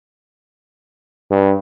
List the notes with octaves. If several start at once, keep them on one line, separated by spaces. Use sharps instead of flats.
G2